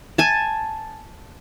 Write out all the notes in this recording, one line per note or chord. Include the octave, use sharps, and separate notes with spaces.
G#5 A5